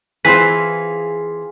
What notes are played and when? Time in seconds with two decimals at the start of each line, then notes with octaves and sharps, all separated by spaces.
0.25 E3 C4 F4 G#4 B4 C5 F5 B6